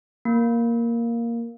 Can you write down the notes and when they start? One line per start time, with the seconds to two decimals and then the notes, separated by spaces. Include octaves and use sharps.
0.25 A#3